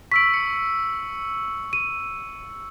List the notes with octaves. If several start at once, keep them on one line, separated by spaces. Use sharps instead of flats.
C#6 E6 B6 D7 F#7
C#7
D#7